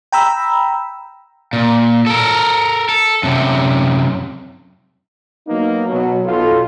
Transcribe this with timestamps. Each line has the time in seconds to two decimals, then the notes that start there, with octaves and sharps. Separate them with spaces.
0.12 G5 A#5 B5 E6
1.53 A#2
2.07 A4 A#4
2.89 A4
3.23 F#2 C3
5.48 F#3 A#3 B3 D#4
5.89 B2 F#3
6.25 B1 F4 A4